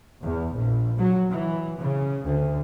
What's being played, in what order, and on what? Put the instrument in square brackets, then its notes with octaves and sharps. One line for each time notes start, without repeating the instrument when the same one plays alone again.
[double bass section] E2
A#1
F#3
E3
C#3
D2